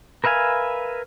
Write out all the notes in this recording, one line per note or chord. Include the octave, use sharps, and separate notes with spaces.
A#4 B4 E5 F5 G#5